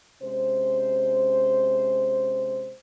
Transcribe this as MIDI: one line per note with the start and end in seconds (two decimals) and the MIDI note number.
0.23 2.74 48
0.23 2.74 56
0.23 2.74 61
0.23 2.74 72